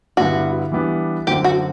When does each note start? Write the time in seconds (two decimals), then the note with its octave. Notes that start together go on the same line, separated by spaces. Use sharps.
0.17 G2 D3 G3 B3 E4 F#4
0.72 E3 G3 B3 D4
1.27 F#2 D3 F#3 A3 C4 G4
1.44 F#4